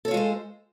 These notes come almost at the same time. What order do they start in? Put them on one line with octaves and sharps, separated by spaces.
A4 C#5 F4 G#3 C5